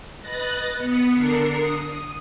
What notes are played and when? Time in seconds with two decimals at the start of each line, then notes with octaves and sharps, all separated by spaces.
0.21 B4 D#5 F#6 A6 A#6
0.78 B3 D#6 C#7
1.13 D3 D4 A#4 C7 C#7
1.55 D#6